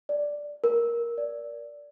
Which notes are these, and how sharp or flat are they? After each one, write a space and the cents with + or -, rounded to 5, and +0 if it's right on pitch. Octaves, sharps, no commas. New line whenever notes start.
D5 +0
A#4 +10
D5 -10